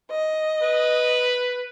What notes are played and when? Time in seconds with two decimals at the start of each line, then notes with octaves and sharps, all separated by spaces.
0.11 D#5
0.63 B4